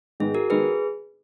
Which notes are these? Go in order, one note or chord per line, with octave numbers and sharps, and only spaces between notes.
G#2 D#3 G#3 B3 D#4 G#4
F#4 A#4
D#3 G#3 B3 D#4 G#4 B4